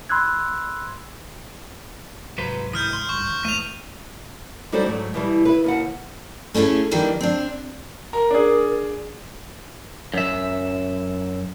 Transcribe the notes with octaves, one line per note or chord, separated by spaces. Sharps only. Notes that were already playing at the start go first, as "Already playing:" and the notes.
B5 C6 E6 F#6 G#6
C2 G#2 F#3 B4 C5
D#3 E3 D#6 F6 G6
C6
G#1 C#2 G2 C#6
D#1 E2
A1 E2 A3 D#7 F7
G3 D#4 F#4 A4 C5 D5
G#2 F#3 A3
B2 E3 G3
E4 B4
D#2 B2 F#5
A3 C#4 D#4 E4 G#4
D#3 E3 G3 A#3 D4
C4 D4
A#4 A#5
D4 G#4
F#2 E5